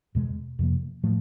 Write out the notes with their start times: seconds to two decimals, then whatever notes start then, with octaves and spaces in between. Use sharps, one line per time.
0.15 E2 B2 G#3
0.59 F2 C3 F3 A#3
1.03 A2 F3 A3